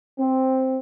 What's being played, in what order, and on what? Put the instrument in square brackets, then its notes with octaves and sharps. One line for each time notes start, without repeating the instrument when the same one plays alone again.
[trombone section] C4